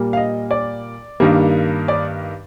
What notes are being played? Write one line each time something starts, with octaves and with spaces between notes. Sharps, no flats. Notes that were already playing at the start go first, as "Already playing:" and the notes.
Already playing: A#2 G3 A#3
F5
D#5
D5
G2 D#3 G3 A#3
D5